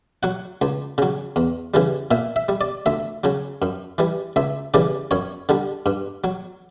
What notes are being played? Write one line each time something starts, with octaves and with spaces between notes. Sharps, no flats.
F#3 F#5
C#2
C#3 F#3
E2
C#3 E3 G3
A#2 E5
E5
G3
D5
D2 E5
C#3 F#3
F#2
E3 G3
C#2 E5
C#3 E3 G3 D5
F#2 C#5
D3 G3
G2
F#3